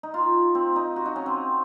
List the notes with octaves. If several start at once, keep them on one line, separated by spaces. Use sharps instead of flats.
D#4
F4
C4
D#4
F#4
D#4
C#4
C4